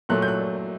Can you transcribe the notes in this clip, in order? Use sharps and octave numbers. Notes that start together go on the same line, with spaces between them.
A#2 F#3 A3 F#6
G6
F#6